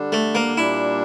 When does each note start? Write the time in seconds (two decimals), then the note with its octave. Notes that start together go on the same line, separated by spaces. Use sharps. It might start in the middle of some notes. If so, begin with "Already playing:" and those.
Already playing: D3 G3 D4
0.12 A3
0.35 A#3
0.58 A#2 G3 D4 E4